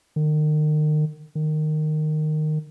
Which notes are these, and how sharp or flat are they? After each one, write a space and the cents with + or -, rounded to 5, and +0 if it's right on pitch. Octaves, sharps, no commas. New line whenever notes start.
D#3 -35
D#3 -15